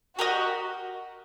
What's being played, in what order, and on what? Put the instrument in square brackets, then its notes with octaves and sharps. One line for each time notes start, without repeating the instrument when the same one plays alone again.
[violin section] F#4 [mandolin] G4 A#4 D#5 G5